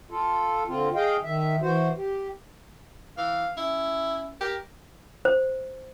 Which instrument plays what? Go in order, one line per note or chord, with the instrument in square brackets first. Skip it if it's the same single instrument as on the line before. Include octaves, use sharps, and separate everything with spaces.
[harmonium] F4 A4
D3 C4 F4
G#4 D#5 F5 G5
D#3 E5
E3 F#4 C5
G4
[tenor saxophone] E3 [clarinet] F5
[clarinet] C#4 [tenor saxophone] E4
[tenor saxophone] G4 [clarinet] A#4
[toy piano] C5